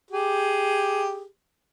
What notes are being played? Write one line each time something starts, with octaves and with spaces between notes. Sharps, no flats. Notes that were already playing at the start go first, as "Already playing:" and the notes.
G4 G#4